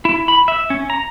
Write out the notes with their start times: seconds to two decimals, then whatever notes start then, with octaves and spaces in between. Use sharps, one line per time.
0.05 E4
0.28 B5
0.48 E5
0.70 C#4
0.90 A#5